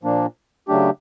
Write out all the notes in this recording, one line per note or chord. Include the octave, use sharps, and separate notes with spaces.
A#2 F3 A#3 D4
C#3 F#3 A3 D4 G4